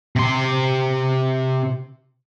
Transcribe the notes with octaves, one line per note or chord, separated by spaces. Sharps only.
C3 C6